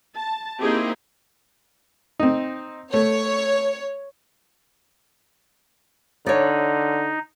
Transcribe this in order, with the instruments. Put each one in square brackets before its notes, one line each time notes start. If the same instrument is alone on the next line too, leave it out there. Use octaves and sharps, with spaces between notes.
[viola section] A5
A#3 C4 D#4 E4 G4 G#4
[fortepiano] C4 D#4
[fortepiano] A3 [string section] C#5
[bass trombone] D3 [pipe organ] D#4 [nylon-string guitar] C#5 D5